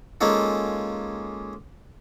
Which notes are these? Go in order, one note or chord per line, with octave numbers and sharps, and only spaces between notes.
G#3 A#3 C#4 D#4 F4 A4